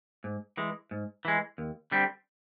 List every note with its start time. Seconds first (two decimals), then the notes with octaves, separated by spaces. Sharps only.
0.24 G#2
0.57 E3 G#3
0.91 G#2
1.25 E3 G#3
1.58 D#2
1.91 D3 G3 C4